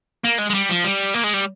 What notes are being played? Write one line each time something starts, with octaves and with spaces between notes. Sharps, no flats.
A#3
G#3
G#3
G3
F3
G3
A#3
G#3
G3